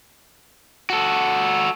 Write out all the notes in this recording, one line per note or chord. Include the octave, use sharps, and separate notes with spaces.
F#4 A4